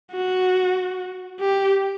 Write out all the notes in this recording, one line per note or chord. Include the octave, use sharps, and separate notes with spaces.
F#4
G4